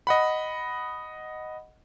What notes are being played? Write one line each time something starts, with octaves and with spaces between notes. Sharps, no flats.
D#5 F#5 B5